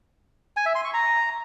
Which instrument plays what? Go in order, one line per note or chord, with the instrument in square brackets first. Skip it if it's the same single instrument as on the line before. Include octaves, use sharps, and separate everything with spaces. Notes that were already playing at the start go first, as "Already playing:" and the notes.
[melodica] G#5
E5
C6
C#6
A#5